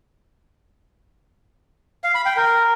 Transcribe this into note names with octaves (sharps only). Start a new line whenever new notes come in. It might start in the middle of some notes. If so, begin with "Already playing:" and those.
F5
B5
G5
A#4